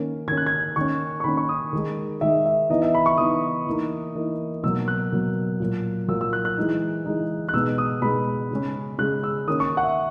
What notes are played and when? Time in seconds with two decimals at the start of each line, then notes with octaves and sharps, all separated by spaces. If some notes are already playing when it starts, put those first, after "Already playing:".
Already playing: D#3 A#3 C#4
0.28 D#3 A#3 C#4 G#6
0.37 F#6
0.46 G#6
0.76 D#3 A#3 C#4 C#6
1.20 C#6
1.24 D#3 A#3 C#4 B5
1.37 C#6
1.49 D#6
1.73 D#3 G#3 D#4
2.21 D#3 G#3 D#4 E5
2.46 E5
2.70 E3 B3 D#4 D#5
2.82 E5
2.94 B5
3.06 C#6
3.18 E3 B3 D#4 D#6
3.66 E3 A#3 D#4
4.15 E3 A#3 D#4
4.63 B2 F#3 A#3 E6
4.88 F#6
5.12 B2 F#3 A#3
5.60 A#2 F#3 A#3
6.08 A#2 F#3 A#3 E6
6.21 E6
6.33 F#6
6.45 F#6
6.58 E3 G#3 D#4
7.05 E3 G#3 D#4
7.49 F#6
7.53 B2 G#3 B3 D#4 E6
7.78 D#6
8.02 B2 G#3 B3 D#4 B5
8.51 C#3 G#3 C#4
8.98 C#3 G#3 C#4 F#6
9.23 E6
9.47 D#3 A#3 C#4 D#6
9.60 C#6
9.77 F#5
9.83 E5